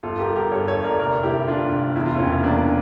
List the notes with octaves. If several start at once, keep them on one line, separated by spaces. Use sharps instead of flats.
G1 F4 A4
G4 A#4
G2
G4 A#4
G2 A4 C#5
A4 C#5
G1
A#4 D5
F1 A#4 D5
F1 E4 G4
F1 D4 F4
F1
E2 E4
F4
E1 C#4 E4
E2 A#3 D4